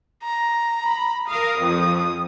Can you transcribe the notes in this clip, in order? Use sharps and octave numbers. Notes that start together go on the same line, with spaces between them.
A#5
B5
A#4 F5 D#6
F2 F3